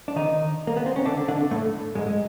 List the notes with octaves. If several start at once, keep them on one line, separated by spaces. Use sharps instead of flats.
D4
D#3 D#4
A#3
B3
C4
C#4
D3 D4
D3 D4
A2 A3
G#2 G#3
G#3